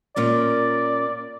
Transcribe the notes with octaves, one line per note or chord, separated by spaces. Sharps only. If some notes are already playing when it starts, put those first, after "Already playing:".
A#2 C#4 A#4 D5